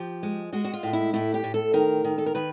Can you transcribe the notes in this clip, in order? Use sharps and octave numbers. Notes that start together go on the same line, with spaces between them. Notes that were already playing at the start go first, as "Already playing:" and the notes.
Already playing: F3 G4
G#3
G#3 F#4
F#4
F4
A2
E4
A2 E4
G4
A2
A4
D#3 A#4
D#3
A4
A#4
D#3 B4